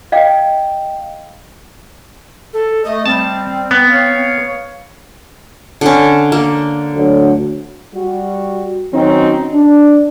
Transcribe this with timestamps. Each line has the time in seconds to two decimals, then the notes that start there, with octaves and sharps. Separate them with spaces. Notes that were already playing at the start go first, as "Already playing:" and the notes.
0.12 D#5 F5 G5
2.53 A4
2.85 A3 D#5
3.06 G3 C4 A5
3.71 B3
3.89 C#5 F5
5.81 D3 C#4
6.32 A#3
6.94 D2 F#3
7.94 G3 F#4
8.93 D#3 F#3 C4 C#4 D#4
9.53 D4